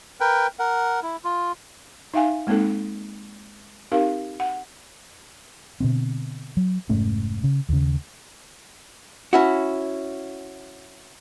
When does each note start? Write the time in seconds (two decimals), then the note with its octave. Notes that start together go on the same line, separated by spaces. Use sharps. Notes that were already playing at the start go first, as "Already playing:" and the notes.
0.20 A#4 B4 G5
0.59 A#4 F#5
1.03 E4
1.25 F4
2.14 D#4 E5 F5 G5 G#5
2.47 G#3 A#3 C4 D#4 A4
3.92 C4 D#4 G4 A#4 F5
4.40 F#5
5.80 B2 D3 C4
6.57 F#3
6.89 F1 G#2 A3 C#4
7.44 C#3
7.69 D#2 C#3
9.33 C#4 E4 F#4